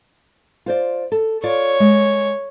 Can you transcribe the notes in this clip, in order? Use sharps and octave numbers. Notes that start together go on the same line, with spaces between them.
F4 C5 D5
A4
F4 C#5 D5
G#3